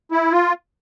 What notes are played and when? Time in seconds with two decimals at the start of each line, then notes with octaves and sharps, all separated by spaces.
0.11 E4
0.32 F4